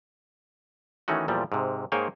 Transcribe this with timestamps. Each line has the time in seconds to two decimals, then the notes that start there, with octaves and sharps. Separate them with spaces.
1.08 D#3 E3 A3 C#4 D#4 F#4
1.28 E2 A#2 F3 G3
1.52 G#2 C3
1.92 G#2 A#3 G#4 C5 C#5 G5